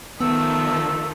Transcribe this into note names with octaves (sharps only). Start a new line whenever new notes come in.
D#3 F3 A3 B3 E6